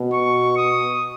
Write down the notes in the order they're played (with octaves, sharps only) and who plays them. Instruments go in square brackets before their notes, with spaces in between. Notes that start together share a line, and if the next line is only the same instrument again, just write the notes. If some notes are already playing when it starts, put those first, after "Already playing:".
Already playing: [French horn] B2
[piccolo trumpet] C#6
D#6